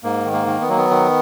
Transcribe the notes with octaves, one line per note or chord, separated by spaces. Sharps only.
G#2 A#3
D#3
A#3
D#3
B3
F#3 A#3
B3
D#3